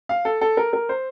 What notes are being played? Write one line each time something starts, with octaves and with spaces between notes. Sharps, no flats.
F5
A4
A4
A#4
A#4
C5